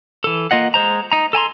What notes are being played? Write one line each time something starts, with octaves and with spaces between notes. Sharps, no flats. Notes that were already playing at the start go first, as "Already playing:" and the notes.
E3 A4
A#3 F4 D#5 F#5
G#3 C5 A#5
D#4 A#5
A4 G#5 A#5 C6